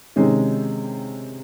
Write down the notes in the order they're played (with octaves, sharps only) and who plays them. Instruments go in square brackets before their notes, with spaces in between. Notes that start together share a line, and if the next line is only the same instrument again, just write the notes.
[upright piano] C3 D#3 G#3 C#4